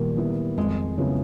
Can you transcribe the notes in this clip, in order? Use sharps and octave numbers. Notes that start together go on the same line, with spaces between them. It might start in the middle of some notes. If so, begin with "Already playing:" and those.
Already playing: A#2 D#3 G3 B3 E4
G3 B3 E4
F2 G#3
C#3 F#3 B3 E4